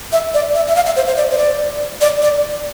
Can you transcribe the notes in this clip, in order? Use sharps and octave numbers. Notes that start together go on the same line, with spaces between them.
E5
D5
E5
E5
F5
E5
C5
C5
D5
C5
D5
D5
D5